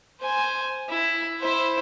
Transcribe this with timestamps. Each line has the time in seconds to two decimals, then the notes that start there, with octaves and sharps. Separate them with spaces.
0.21 C5 G#5
0.89 E4
1.40 E4 C5